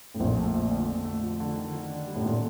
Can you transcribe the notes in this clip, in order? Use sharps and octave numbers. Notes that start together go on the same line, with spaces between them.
A2
A#1 F2 A#2
A3
F3
D3
F2
A3
F3
D3
D#3
D#3
D4
G3
A2
A#2 D#3